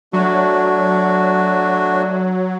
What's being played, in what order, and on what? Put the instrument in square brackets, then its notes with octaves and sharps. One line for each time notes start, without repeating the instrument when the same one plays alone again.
[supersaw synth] F#3 [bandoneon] A3 D4 F#4